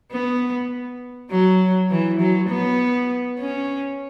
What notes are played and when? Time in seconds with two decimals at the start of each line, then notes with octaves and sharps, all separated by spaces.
0.12 B3
1.31 F#3
1.91 E3
2.20 F#3
2.49 B3
3.39 C#4